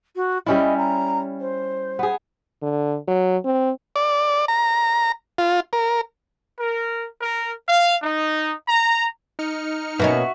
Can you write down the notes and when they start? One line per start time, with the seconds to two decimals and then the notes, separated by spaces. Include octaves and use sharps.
0.16 F#4
0.46 G3 C#4 E4 D#5
0.77 A#5
1.40 C5
1.99 B3 G#4
2.62 D3
3.08 F#3
3.45 C4
3.96 D5
4.48 A#5
5.38 F4
5.73 A#4
6.59 A#4
7.21 A#4
7.68 F5
8.03 D#4
8.68 A#5
9.39 D#4 F6 C#7
9.99 B2 A#3 C#4 F#4 B4 D#5 E5 C#6